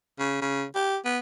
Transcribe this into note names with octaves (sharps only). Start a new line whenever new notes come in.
C#3
C#3
G4
B3